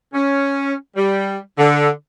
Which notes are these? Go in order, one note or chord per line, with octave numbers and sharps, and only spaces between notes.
C#4
G3
D3